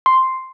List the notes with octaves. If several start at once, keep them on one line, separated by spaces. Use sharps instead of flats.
C6